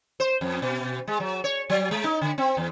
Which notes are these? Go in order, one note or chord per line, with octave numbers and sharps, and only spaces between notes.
C5
F2
B2
G#3
F#3
C#5
F#3
G#3
D#4
D3
C4
E2